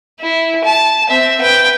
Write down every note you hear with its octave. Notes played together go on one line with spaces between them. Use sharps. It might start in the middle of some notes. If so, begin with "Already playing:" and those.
E4
A5
C4 E5
B4 G5